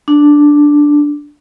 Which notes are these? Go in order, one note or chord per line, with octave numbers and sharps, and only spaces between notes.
D4